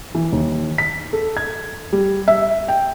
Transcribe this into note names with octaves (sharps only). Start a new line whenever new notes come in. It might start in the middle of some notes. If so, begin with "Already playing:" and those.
E3
D#2
B6
A4
G#6
G3
E5
G5